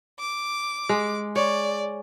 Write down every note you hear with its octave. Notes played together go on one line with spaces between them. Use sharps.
D6
G#3
C#5 D5